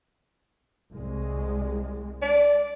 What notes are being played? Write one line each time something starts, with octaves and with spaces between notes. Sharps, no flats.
C2 G#3
D5